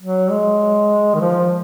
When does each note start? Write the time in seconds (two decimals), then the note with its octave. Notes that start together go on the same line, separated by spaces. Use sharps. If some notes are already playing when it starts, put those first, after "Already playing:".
0.01 F#3
0.31 G#3
1.15 D#3
1.20 F3